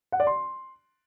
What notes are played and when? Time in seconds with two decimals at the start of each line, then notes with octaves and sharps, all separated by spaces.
0.12 F#5
0.20 D5
0.27 C6